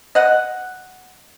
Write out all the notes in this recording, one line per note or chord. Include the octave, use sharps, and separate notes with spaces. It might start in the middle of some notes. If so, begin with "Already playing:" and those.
D#5 F#5